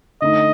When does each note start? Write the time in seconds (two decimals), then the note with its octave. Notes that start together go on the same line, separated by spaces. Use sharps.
0.21 D3 A3 D#4 D#5